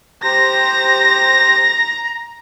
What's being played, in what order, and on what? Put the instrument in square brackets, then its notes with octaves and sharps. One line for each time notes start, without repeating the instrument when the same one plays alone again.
[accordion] G4 C5 [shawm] A#5 [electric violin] A#6